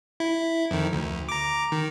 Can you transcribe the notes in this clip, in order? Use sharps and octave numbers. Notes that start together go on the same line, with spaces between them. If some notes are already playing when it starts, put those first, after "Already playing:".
E4
F2 D#3
D2
A#5 D6
D#3